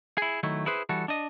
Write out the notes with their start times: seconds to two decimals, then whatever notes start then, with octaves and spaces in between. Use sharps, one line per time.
0.18 E4 G#4
0.43 D#3 F#3 A3 E4
0.66 E4 G#4 B4 C5
0.89 E3 G3 F#4 A4
1.08 D4 D#5